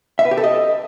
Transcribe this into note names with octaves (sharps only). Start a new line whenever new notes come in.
E5
B4
G4
A4
D#5